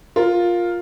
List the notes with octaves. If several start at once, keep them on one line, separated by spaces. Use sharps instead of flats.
F4 A#4